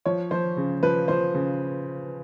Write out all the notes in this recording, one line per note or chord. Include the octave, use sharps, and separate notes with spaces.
F3 C#5
F3 C5
C#3
F3 B4
F3 C5
C#3